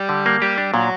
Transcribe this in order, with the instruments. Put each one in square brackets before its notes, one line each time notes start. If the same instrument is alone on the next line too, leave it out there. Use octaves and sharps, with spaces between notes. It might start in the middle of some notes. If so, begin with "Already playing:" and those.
Already playing: [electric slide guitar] G3
[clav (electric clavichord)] D3
A#3
[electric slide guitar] G3 [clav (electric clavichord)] G4
[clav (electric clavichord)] D4
[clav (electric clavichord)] A#2 [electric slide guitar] F#3